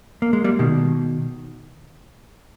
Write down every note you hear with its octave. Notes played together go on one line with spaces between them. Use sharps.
A#3
G#3
G3 A#3
B2 D#3